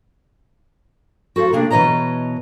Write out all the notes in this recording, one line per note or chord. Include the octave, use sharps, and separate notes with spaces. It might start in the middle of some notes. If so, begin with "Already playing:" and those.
F#4 A4 C5 F5
C3 A#3 D4 G#4
B2 E3 B4 C#5 D#5 A#5